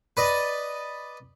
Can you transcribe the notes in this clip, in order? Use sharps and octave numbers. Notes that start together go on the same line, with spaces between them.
B4 D5 D#5